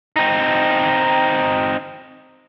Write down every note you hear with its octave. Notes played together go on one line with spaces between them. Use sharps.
C4 D#4